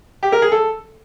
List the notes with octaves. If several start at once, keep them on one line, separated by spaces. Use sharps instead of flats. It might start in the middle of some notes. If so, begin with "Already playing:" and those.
G4
A#4
G#4
A4